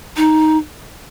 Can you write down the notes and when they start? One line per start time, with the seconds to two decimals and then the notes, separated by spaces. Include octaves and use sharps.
0.17 D#4